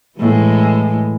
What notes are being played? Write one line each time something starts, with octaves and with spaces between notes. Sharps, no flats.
A2 E3 G#3